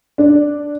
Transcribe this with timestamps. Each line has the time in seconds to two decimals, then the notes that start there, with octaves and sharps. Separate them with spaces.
0.18 D4